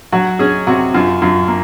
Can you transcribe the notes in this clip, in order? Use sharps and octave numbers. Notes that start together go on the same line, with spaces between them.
F#3 F#4
C#4 G#4
C3 F#4
F#2 F4
F#2 F4
A#3